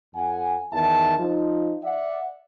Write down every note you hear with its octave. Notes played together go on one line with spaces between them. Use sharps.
F2 F#5 G#5
E2 D#3 E5 A5
F3 D#4
D5 E5 F#5